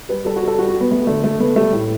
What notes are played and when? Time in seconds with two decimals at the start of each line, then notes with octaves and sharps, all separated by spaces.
0.09 G3 B4
0.25 G3 A4
0.36 F#4
0.42 G3
0.48 A4
0.58 G3 F#4
0.69 F#4
0.74 G3
0.81 B3
0.91 A3 B3
1.07 D3 A3
1.24 A3
1.40 A3 B3
1.56 G3 A3
1.72 A2